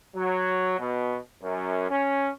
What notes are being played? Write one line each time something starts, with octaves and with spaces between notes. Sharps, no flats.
F#3
B2
F#2
C#4